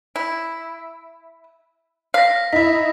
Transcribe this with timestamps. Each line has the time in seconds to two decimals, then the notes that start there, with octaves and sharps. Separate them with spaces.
0.16 E4
2.14 F5 A#6 B6
2.53 D#4 E4 B6